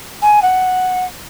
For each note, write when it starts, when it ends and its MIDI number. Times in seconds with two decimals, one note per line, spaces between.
0.22 0.39 80
0.42 1.04 78